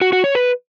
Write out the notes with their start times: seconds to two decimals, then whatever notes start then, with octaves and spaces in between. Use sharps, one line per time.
0.01 F#4
0.13 F#4
0.24 C#5
0.35 B4